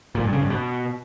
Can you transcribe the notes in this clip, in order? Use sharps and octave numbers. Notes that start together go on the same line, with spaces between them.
A#2
G2
C#3
G2
B2